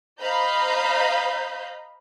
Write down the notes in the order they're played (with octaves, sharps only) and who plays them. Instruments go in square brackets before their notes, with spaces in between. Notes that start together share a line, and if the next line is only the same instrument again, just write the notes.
[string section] C5 D#5 F5 A#5 B5 G6